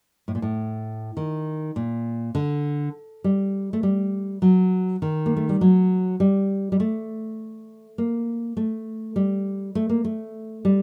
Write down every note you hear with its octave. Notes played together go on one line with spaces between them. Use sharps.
A2
A#2
A2
D#3
A#2
D3
G3
A3
G3
F#3
D#3
A#3
A3
G3
F#3
G3
G3
A3
A#3
A3
G3
A3
A#3
A3
G3